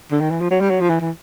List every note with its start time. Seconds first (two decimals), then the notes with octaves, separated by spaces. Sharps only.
0.11 D3
0.21 D#3
0.31 E3
0.41 F3
0.51 F#3
0.61 G3
0.70 F#3
0.81 F3
0.90 E3
1.00 E3